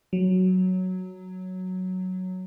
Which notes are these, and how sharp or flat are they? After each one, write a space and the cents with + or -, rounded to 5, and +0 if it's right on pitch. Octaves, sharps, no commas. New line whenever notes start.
F#3 +0